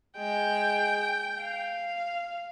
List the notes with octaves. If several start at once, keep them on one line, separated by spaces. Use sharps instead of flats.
G#3 G5
F5